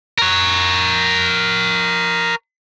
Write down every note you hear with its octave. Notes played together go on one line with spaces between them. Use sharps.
A#4 C#5